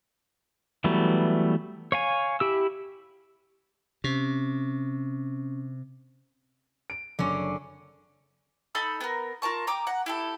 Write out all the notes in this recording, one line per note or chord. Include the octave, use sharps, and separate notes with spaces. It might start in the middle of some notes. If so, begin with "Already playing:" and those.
E3 F#3 G3 A3 B3
C#5 F5 G#5
E4 G4 E6
C3 C#4
D7
F#1 D3 C#4
D#4 A4 B5 E6
B3 A#4
F4 A#4 A5 C#6
G5 A#5 D6 D#6
F#5 A#5
E4 G4 A4